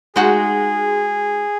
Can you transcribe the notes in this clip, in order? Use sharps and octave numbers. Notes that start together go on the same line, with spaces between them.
G#3 D#4 F#4 G#4